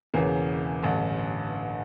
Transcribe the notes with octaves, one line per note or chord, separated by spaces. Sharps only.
E1 E2 C#3 E3 A#3
A1 G2 D3